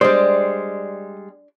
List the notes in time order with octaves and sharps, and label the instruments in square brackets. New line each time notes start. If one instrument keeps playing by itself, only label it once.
[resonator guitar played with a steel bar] G3 G#3 [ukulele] D4 D5 [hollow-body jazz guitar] C5